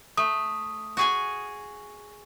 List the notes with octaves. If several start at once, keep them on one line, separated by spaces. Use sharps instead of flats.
A3 D#6
F#4 G#4 G#5